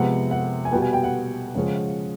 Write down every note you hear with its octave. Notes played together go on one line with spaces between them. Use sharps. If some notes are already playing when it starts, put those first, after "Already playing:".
Already playing: C3 F3 G#3 B3 F#5
F#5
G#5
B2 G3 B3 G5
G#5
G5
F#5
C#3 F3 G#3 C#4